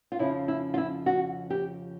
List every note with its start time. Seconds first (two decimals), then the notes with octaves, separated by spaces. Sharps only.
0.12 F4
0.19 F2 C#3 F3 E4
0.48 E4
0.74 F4
0.77 E4
1.06 F#4
1.50 G4